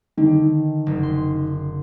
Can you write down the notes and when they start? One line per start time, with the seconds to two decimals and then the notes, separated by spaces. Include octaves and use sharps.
0.17 D3 D#3
0.86 F#1
1.03 C6